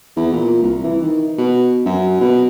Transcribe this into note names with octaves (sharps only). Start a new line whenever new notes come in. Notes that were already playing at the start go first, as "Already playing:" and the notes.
E2
A#2
C2
E3
D#3
B2
F#2
B2